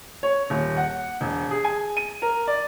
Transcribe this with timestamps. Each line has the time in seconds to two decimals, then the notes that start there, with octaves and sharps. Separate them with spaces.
0.23 C#5
0.50 D#1
0.77 F#5
1.21 E1
1.51 G#4
1.64 G#5
1.97 D#7
2.22 A#4
2.48 D5